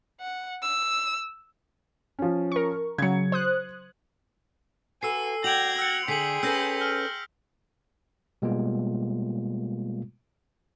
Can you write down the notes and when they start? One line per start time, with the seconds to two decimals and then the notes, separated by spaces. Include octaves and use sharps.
0.21 F#5
0.62 E6
2.19 F3 C#4
2.52 A#4 C#6
2.98 C#3 F#3 G#6 C#7
3.32 C5 D#6 F#6
5.03 F#4 A4 B4 G#5 E6 C7
5.44 F#4 D5 G5 G#6 A#6 D7 F7 F#7
5.79 G5 E6 F#6 C#7
6.08 D3 G#4 C5 G5 B6 C7 F#7
6.43 C#4 A4 B4 E6 G6 A#6
6.81 F6
8.42 B2 G3 G#3 A#3 B3 F4